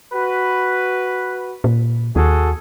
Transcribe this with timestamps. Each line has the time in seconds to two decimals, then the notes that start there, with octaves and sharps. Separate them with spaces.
0.13 F#4 B4
1.64 A#2
2.16 D#2 F#4 G#4 A4